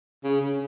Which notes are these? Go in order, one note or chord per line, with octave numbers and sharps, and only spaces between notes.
C#3
C#3